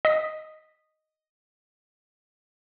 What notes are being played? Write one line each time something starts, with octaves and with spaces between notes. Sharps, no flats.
D#5 D#6 B6